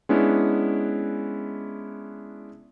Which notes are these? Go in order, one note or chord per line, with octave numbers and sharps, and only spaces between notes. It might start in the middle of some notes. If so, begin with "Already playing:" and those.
G#3 B3 C#4 D4 E4